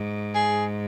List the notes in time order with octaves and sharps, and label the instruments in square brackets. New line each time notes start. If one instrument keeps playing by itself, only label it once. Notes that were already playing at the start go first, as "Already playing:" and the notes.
Already playing: [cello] G#2
[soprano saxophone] G#4